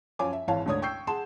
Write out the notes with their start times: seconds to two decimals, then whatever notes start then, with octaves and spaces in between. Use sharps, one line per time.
0.19 F#2 F3 C#5 G#5 D6
0.33 E5
0.48 G#1 E3 C#5 F5 A5
0.66 D2 G#2 D4 C#5 D#6 G#6
0.82 G5 C#6 E6 G6 C7
1.07 G#4 F#5 A5 C6 E7